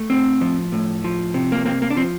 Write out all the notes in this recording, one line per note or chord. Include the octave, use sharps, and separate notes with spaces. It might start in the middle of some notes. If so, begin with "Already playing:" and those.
Already playing: A3
A2 C4
F3
A2
F3
C3
A#3
A#3 C4
A#3
D4
F3 C4